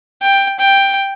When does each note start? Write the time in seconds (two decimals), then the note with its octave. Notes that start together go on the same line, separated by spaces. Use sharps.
0.22 G5
0.59 G5